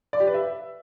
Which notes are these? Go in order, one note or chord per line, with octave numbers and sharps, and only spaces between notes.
D5
G4
B4
E5